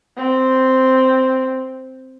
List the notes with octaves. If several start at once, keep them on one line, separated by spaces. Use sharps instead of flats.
C4